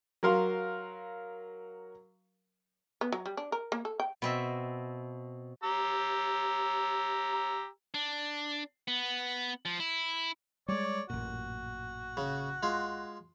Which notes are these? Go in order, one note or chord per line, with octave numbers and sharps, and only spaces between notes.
F#3 A#4 F5 C6
B3
F#3
G3
D4
A#4
A#3
A4
G5
B2 C4 E5
G4 A#5 E6
D4
B3
F3
E4
G3 G#3 C#5 D5
A1 F#2 A#2 F#4
C#3
G#3 F4